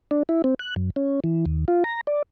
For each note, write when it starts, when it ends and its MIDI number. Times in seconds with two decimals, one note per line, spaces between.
0.11 0.23 62
0.29 0.42 64
0.44 0.54 60
0.59 0.74 90
0.76 0.90 42
0.96 1.20 61
1.24 1.45 52
1.46 1.65 39
1.68 1.84 65
1.84 2.01 82
2.07 2.22 74